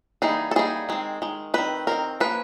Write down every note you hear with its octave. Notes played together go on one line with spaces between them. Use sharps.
E3 G3 A#3 D#4 G#4
A4
E3 G3 A#3 D#4 G#4
D#3 G#3 C4
D#3 G#3
D#3 G#3 C4 B4
D#3 G#3 C4 A#4
F3 A#3 C#4 B4